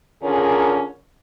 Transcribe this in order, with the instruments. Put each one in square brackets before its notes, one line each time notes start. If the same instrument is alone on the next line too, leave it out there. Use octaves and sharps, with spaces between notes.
[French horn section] D3 C#4 F4 G#4 A#4